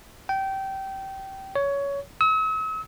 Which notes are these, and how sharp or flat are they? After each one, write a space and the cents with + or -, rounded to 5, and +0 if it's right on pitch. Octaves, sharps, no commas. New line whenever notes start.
G5 -20
C#5 +15
E6 -45